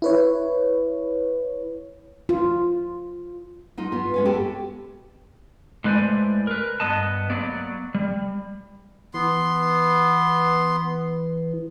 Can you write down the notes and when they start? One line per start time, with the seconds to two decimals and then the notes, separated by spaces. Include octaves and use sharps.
0.02 E4 B4 C#5
2.29 F4
3.78 F#3 D#4 F4
3.92 B3 F4
4.14 G#3 C#4 F5
4.25 B3 F#4 G4 A4
5.84 A2 G#3 B4 C5 D5 G#5
6.47 A#4 B4
6.80 G2 B3 D#5 A5
7.30 F#3 A#3 B3 D5
7.95 G3
9.14 E3 B3 C6